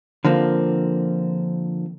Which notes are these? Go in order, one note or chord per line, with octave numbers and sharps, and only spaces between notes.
D3 F3 A#3 C4